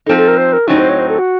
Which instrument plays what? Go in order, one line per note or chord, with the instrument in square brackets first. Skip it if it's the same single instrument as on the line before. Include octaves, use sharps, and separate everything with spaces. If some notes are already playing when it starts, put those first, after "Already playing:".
[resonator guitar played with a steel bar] D#4 [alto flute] A4
[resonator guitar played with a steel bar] F3 C4
[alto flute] A4
A#4
C5
A#4
[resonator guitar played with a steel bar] A2 F#3 C4 D#4 [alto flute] C#4
[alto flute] C5
C#5
C5
A4
F#4